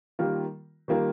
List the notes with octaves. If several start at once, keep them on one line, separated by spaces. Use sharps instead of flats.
D#3 G3 A#3 F4 A#4
D#3 G3 A#3 F4 A#4